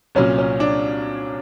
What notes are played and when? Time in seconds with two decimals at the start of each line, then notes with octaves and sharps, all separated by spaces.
0.15 C2 A#2 F#3 C#4
0.38 C#4
0.60 D4